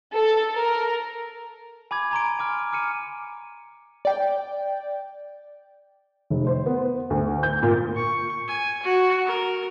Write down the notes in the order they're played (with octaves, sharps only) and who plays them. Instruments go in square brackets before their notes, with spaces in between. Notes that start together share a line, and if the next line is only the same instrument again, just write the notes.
[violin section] A4
A#4
[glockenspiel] G#5 B5 D6 G#6
G#5 A#5 C6 D7
G#5 D6 F6
D6 F6 C#7 D#7
[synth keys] D5 G5
[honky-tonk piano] F1
C5
B3
D2
G6
A#2
[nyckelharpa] C#6
G#5
F#4
A#4